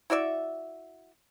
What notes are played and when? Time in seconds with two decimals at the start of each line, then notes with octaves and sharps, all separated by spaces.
0.10 E4 F#4 D5 E5